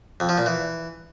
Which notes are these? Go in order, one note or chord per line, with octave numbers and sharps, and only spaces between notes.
F2
F3
A#2
E3